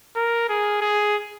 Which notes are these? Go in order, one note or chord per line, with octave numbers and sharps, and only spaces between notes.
A#4
G#4
G#4